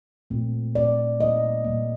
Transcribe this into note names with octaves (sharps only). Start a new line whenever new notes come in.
A#2 A3 C4
A#2 A3 C4 D5
A#2 G3 A#3 D#5
A#2 G3 A#3